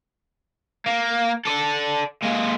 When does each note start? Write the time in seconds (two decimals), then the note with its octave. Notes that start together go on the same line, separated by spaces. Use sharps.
0.86 A#3
1.45 A4 D5
2.22 G#3 A#3